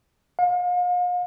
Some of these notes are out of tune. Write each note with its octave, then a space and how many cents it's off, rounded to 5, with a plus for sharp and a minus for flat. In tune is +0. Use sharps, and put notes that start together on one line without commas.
F5 +40